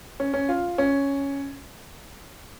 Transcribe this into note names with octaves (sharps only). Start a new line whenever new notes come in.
C#4
C#4
F4
C#4